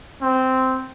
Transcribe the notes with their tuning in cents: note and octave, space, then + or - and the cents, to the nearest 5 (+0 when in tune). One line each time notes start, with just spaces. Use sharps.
C4 -10